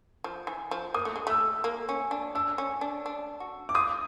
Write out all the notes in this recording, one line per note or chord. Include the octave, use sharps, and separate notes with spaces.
F3
E3
F3
A#3 D#6
A3
G#3
A3 E6
A#3
C#4
D4
D4 E6
C#4
D4
D4
F#4
D6
F4 D#6